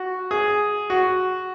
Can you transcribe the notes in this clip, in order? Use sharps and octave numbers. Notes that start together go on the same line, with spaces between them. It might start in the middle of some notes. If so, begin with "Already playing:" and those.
Already playing: F#4
G#4
F#4